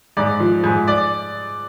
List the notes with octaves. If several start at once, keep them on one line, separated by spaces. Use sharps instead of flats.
G#2 D5
F3
G#2
D5